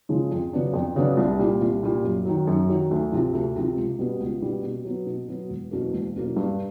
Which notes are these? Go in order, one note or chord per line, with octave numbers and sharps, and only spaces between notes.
C#3 F3 G#3
F2
C#3 F#3 B3 D4
F2
C#3 F#3 B3 D4
C2
A#2 G3
C2
A#2 G3
F#2
D#3 F#3
F#2
D#3 F#3
D2
C3 F3
D2
C3 F3
C#2
B2 G3 B3
C#2
B2 G3 B3
B2
F#3 B3
B2
F#3 B3
E1
E2 B2 F#3 A#3
E1
E2 B2 F#3 A#3
G2